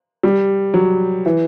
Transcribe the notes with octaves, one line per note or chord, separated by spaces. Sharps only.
G3
F#3
E3